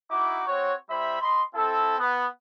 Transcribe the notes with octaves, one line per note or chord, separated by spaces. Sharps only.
D#4 E4 F#4 D6
C4 F#4 C#5
G3 E4 C5 E5 B5
D#5 B5 C6
C4 E4 A4
B3